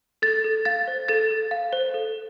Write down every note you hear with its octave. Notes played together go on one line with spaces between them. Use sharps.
A4 A6
A4
F5 A6
C5
A4 A6
A4
F5
C5
A4